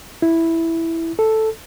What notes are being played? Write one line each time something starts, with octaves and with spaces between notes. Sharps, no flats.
E4
A4